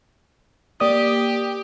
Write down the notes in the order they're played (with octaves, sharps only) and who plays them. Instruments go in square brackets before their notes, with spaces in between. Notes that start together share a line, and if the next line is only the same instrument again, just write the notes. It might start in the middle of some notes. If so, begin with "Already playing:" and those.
[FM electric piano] A#3 D5 D#6 [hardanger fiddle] G4